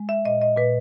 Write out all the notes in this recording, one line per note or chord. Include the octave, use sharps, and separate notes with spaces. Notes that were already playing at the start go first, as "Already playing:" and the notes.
Already playing: G#3
E5
A#2 D#5
D#5
A#2 B4